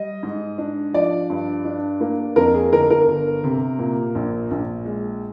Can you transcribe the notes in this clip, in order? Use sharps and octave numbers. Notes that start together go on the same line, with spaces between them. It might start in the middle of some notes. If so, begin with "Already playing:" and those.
Already playing: G3 D#5
G#2
D4
F3 D5
G2
D4
A#3
F2 A#4
G#4
G1 A#4
A#4
G1
C3
A#2
A#1
A#1
G#3